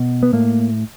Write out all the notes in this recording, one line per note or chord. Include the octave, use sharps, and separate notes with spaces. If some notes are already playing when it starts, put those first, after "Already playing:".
Already playing: B2
B3
A2 A#3